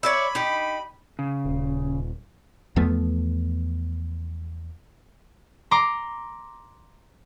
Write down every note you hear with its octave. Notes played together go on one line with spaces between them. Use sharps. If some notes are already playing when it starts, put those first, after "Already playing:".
C#5 D5 E5 B5
D#4 G4
C#3
D#1
E2 F3 A3 B3
A#5 C6 D6